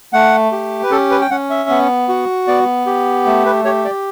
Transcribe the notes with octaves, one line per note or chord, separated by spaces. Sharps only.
A3 F#5
G4
B4
C#4 A4
B4
G5
C#4 F#5
E5
B3
F#4
B3 D5
G4
A3
B4
G4 C#5
D5